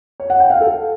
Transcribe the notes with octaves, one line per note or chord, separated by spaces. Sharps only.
C#5
F#5
G5
F5
A4